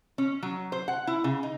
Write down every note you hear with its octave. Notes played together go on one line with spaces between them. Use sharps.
C#4
F#3
C5
F#5
E4
C#3
D#4